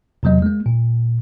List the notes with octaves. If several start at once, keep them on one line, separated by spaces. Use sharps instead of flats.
E2 C3 F#3 A#3 D#5
G#3 A#3
A#2